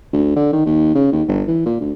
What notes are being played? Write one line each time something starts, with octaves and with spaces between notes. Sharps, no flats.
D2
D3
D#3
D#2
C#3
D#2
G1
E3
A#2
D2